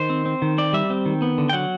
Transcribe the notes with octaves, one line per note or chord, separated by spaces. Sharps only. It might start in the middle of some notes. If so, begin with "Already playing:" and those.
Already playing: D#3 C5
C4
C4
D#3
C4 D5
G3 E5
C4
D#3
B3
D3
G5
F#3 F#5